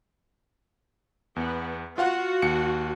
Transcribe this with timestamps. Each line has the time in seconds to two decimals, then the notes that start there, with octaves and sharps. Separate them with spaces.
1.36 E2 B3
1.98 F4 F#4 F5 F#5
2.42 D#2 C#7